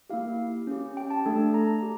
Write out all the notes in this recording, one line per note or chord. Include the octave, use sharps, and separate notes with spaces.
A#3 E4 G4 F5
C#4 G4
G5
A5
A3 D4 A4
A#5
G4